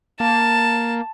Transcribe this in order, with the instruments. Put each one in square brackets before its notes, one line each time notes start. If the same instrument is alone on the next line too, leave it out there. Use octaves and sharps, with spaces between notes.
[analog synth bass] A#3 [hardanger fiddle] A5